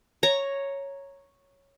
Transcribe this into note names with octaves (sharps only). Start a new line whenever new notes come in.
C#5 A#5